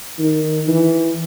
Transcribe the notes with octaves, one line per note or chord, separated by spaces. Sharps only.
D#3
E3